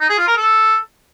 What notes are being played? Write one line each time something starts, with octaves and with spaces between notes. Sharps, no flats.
D#4
G#4
F4
A#4
A4